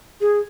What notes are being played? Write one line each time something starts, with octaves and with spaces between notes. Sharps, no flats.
G#4